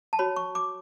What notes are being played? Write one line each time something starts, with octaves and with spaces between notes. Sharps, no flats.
A5
F#4 C#5 B5
C#6
D6